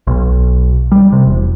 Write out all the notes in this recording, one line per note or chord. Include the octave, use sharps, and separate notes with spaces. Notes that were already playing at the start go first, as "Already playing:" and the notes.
B1
G3
C3
E1